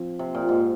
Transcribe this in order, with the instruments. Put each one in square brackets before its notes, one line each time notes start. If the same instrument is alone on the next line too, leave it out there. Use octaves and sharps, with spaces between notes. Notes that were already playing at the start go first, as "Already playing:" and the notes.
Already playing: [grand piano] F3 C4 F4
[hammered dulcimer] C3
A#2
G#2